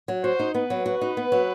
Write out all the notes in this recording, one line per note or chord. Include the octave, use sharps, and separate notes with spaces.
F#3
F#4 C5
D#4
B3 B4
F#3
F#4 B4
D#4
B3
F#3